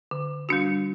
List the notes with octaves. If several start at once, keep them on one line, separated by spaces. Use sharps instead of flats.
D3
G3 D4 F#4